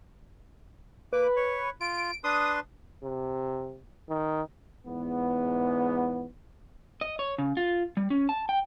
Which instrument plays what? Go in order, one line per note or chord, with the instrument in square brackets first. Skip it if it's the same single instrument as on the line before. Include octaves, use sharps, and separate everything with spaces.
[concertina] A#3 D6 [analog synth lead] B4
[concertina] C#5
[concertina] F4 [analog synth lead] D7
[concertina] D4 B4 C6 [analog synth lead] D#6
[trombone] C3
D#3
[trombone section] E2 G#2 B3
[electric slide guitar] D#5
C#5
C#3
F4
G3
C#4
A5
G5